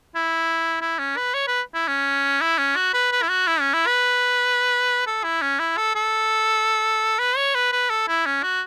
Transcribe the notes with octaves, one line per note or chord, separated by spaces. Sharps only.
E4
E4
C#4
B4
C#5
B4
E4
C#4
E4
C#4
F#4
B4
B4
E4
F#4
E4
C#4
E4
B4
A4
E4
C#4
E4
A4
A4
B4
C#5
B4
B4
A4
E4
C#4
F#4